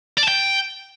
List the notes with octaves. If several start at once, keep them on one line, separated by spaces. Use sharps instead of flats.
D5
A5
G5